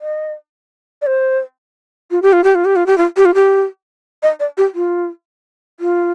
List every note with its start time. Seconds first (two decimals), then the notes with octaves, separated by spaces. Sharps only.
0.01 D#5
1.02 D5
1.07 C5
2.11 F4
2.22 G4
2.33 F4
2.44 G4
2.55 F4
2.65 G4
2.76 F4
2.86 G4
2.98 F4
3.17 G4
3.25 F4
3.34 G4
4.23 D#5
4.40 D5
4.57 G4
4.75 F4
5.80 F4